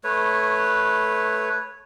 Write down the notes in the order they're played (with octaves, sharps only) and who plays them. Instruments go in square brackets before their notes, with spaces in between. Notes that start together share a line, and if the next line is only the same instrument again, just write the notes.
[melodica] A3 B4 C#5